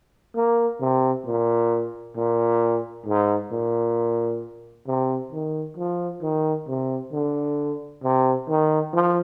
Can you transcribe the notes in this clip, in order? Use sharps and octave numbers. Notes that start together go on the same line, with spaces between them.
A#3
C3
A#2
A#2
G#2
A#2
C3
D#3
F3
D#3
C3
D3
C3
D#3
F3